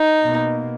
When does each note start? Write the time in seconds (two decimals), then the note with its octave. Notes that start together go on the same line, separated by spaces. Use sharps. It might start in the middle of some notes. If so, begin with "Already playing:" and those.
Already playing: D#4
0.23 B2 A#3